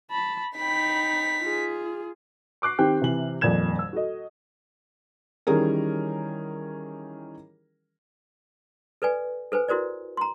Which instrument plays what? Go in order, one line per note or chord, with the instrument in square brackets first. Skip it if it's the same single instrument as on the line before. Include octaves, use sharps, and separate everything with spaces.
[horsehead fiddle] A5 B5
[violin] D#4 B6 [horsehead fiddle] G5 B5
[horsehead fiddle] F4 G#4
[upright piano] C#6 D6 F#6 C7
D#3 C4 G4 G5 F#6
C3 E3 F#7
D#1 F2 A#2 D5 G#6 E7
E6
F#4 A4 D#5
[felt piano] D#3 E3 G3 C#4 G#4 A#4
[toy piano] A4 B4 D5 G#5
A4 B4 C5 G#5
E4 F#4 A#4 C5 D5
A#5 C6